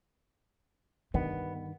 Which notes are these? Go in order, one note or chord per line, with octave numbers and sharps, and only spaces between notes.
G2 D3 D#3 B3